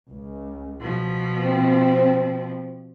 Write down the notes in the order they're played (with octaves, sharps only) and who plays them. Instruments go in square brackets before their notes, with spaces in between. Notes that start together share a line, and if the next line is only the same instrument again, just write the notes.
[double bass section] C#2
[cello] B2 F3
[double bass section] C4